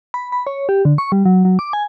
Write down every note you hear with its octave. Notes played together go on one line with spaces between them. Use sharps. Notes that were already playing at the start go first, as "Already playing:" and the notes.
B5
B5
C#5
G4
D3
C#6
G3
F#3
F#3
D6
G#5